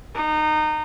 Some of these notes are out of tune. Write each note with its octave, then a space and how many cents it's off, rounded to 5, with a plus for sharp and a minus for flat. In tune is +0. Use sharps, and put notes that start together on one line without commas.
D#4 -25